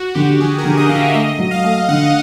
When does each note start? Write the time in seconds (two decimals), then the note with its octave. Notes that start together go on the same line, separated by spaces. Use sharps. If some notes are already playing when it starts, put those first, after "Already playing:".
Already playing: F#4
0.15 D3 G4
0.39 D3 G#4
0.58 A#4
0.65 D3
0.77 D#5
0.89 D3 F5
0.95 E5
1.08 E5
1.14 A3 D#5
1.39 F#3
1.51 F5
1.64 A3
1.88 D3 F#5